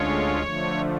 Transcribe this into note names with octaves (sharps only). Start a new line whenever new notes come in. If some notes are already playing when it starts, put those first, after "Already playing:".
Already playing: D2 D3 G#3 C#4 F4 C#5
D3 F3 A3